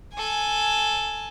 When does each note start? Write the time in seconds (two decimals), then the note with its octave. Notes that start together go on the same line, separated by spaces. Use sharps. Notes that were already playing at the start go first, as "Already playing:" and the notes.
0.14 A4 G#5